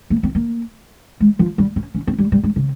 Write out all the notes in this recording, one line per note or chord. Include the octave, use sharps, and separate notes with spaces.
A#3
C4
A#3
G#3
F3
G3
C#4
C#4
C4
G3
G3
G#3
C#3